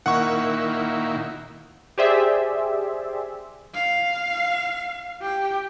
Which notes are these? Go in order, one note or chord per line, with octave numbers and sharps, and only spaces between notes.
A#2 D#3 E4 F#5 C#6
G4 G#4 C5 D5 E5
F5
G4